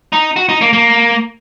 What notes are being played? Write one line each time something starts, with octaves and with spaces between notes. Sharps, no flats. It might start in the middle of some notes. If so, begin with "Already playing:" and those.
D#4
F#4
D#4
A#3
A#3